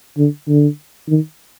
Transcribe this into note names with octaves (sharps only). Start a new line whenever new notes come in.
D3
D3
D#3